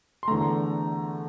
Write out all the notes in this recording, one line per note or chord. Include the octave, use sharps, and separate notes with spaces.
C6
E2 D3 A3 A#5